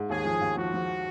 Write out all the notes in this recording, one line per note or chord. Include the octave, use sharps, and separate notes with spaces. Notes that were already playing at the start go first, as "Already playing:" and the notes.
Already playing: G#2
D#2 G#4
F3
D#2
F3 F#4
F3